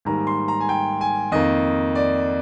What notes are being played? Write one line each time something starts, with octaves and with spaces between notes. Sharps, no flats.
G#2 D#3 G3 A#3 A#5
C6
A#5
G#5
G5
G#5
F2 D#3 A#3 D#5
D5